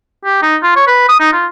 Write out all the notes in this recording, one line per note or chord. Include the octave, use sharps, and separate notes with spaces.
G4
D#4
F4
C#5
B4
D#6
D#4
F4